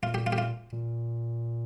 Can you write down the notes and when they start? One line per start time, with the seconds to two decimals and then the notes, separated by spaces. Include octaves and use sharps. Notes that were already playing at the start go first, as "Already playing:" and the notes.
0.03 A#2 F4
0.14 G4
0.27 F4
0.32 G4
0.38 F4
0.72 A#2